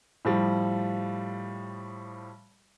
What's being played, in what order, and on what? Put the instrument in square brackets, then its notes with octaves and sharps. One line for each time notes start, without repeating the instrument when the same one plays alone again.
[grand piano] A2 F3 G3